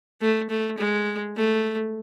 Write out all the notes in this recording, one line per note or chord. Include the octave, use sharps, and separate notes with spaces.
A3
A3
G#3
A3